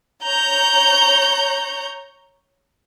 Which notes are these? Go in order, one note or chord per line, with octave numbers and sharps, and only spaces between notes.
C#5 A#5 G6